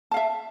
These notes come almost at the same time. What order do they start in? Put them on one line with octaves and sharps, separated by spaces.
A5 F5 E5